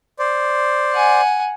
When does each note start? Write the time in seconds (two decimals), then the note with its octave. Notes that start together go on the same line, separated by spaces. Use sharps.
0.19 C5 D5
0.93 F#5 G#5